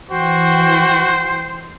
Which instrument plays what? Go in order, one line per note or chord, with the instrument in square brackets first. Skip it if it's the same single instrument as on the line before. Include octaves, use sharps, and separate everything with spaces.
[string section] E3 G5 [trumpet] F#4 [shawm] C5